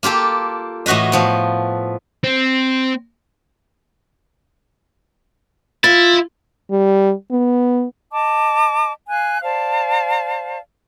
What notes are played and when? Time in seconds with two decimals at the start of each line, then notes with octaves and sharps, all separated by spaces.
0.03 A#3 F4 G4 A4
0.86 A2 E3 F#4 B4 D#5
1.12 A2 F3 B3
2.24 C4
5.84 E4 F4 A6
6.71 G3
7.32 B3
8.12 D#5 A5 D6
9.08 F5 G#5 F#6
9.42 C5 D5 F5 A5